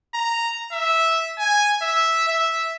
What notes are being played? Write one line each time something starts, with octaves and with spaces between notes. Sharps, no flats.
A#5
E5
G#5
E5
E5